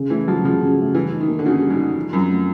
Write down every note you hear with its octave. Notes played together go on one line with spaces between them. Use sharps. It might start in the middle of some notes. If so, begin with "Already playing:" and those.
Already playing: C#3
E3 A3
F3 F#3
C#3 F3
C#3
A3
E3 G3
D#4
D#3
A#3
D3
C#3 F#4
G3
G#2
D#4
F3
F#2 C4
A3